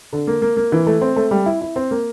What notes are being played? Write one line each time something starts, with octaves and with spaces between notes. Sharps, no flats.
D3
A#3
A#3
A#3
E3
A3
C4
A3
G3
E4
E4
C4
A#3